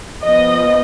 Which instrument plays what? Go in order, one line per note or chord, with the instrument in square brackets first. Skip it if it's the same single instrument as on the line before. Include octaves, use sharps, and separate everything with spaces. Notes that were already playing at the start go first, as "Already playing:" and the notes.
[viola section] F3 B3 D#5